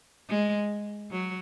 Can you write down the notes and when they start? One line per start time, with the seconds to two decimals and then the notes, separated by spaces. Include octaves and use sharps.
0.29 G#3
1.11 F#3